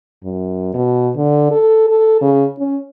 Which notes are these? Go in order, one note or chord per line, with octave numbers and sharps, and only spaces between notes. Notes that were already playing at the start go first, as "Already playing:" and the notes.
F#2
B2
D3
A4
A4
C#3
C#4